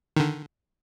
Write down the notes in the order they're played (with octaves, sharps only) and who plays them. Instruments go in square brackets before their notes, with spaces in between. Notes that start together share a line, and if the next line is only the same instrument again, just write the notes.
[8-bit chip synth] D3 D#3